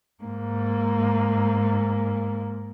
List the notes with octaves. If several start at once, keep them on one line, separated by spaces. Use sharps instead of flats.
G#2 A#3